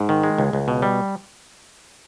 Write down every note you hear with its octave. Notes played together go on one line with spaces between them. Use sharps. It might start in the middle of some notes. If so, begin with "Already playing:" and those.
Already playing: G#2
D#3
G#3
C#2
C#2
B2
G3